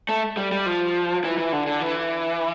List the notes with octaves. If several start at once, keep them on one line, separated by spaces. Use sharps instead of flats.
A3
G3
G3
F3
E3
E3
D3
D3
E3